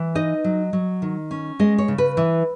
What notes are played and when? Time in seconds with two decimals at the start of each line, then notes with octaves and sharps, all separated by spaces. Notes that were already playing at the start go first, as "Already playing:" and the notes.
Already playing: E3
0.15 D#4 D#5
0.44 F#3
0.73 F#3
1.02 D#3
1.31 C#4
1.59 G#3 D#5
1.78 C#5
1.88 C#3
1.98 B4
2.17 E3